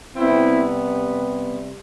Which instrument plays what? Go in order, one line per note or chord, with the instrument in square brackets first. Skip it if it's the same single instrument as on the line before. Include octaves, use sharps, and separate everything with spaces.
[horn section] C3 G3 B3 C4 E4